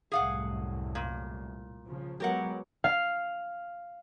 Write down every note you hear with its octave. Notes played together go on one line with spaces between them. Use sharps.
C2 F#2 A2 G#4 F5 F#5
A#2
C#3 F3
F#3 G#3 B3 G4 A#4 F#5
F5